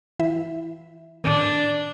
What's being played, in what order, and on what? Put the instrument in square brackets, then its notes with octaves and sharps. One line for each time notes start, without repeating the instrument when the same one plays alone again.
[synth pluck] E3 E4 E5
[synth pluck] A2 D#3 [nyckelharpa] D4